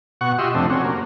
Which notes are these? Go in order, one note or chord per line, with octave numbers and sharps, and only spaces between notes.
B2 F#4 F#5 C#6
F4 G4 D#5 E5 C6
F2 C3 A3 C4 D4
C4 C#4 F#4
A#3